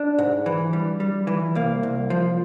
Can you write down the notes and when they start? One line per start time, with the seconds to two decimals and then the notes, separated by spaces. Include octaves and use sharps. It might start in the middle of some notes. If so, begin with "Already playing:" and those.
Already playing: D4
0.18 G#2
0.46 E3
0.73 G3
1.00 G3
1.27 E3
1.55 C2 A#3
1.83 C2
2.10 F3